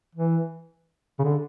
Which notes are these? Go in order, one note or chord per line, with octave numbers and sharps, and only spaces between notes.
E3
C#3
D3